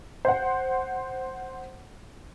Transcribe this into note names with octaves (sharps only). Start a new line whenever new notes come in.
C5 F#5